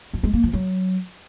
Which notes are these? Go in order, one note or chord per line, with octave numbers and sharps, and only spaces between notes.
F3
G#3
A#3
F3
F#3